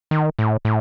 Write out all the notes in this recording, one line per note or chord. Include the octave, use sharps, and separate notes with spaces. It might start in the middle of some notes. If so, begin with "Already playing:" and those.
D#3
A2
A2